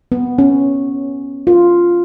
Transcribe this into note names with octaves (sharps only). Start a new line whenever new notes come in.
B3
C#4
F4